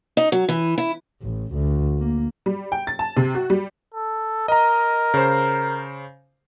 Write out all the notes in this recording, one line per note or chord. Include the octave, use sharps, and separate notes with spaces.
D#4
F#3
E3
E4
A1
D2
A#3
G3
G5
A6
A5
C3
F#4
G3
A4
A#4 D#5 A#5
C#3 C5